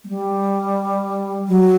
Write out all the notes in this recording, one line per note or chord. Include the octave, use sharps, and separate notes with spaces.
G#3
G3
F#3